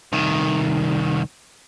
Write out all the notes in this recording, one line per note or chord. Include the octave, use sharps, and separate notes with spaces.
C2 D#3